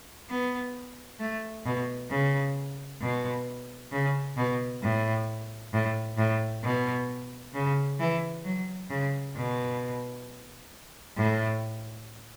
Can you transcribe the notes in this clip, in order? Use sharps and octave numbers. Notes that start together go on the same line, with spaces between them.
B3
A3
B2
C#3
B2
C#3
B2
A2
A2
A2
B2
C#3
E3
F#3
C#3
B2
A2